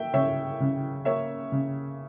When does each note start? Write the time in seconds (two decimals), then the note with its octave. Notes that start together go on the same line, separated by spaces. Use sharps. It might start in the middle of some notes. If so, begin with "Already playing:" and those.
Already playing: A#3 E5 G5
0.13 C#3 C#5 E5
0.60 C#3
1.05 A#3 C#5 E5
1.52 C#3